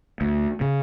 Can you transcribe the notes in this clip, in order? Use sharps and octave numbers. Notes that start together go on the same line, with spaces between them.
D2
C#3